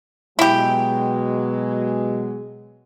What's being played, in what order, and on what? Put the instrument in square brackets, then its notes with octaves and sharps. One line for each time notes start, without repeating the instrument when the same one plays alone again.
[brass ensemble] B2 F#3 G#3 [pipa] E4 G4